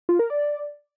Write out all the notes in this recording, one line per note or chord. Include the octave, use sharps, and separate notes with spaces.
F4
A#4
D5